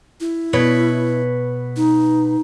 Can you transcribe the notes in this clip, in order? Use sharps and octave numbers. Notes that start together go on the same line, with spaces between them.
E4
B2 B4 C#5
D#4